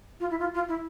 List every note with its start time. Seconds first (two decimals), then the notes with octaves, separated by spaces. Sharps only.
0.20 F4
0.30 E4
0.39 F4
0.54 F4
0.68 E4